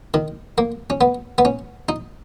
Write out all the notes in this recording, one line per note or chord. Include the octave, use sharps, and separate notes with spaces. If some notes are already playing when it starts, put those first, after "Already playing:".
D#3
A#3
C#4
B3
B3
C#4
D#4